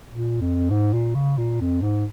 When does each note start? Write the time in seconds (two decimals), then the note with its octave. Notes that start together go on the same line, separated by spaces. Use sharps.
0.10 A#2
0.41 F2
0.70 G#2
0.93 A#2
1.15 C#3
1.38 A#2
1.61 F2
1.82 G#2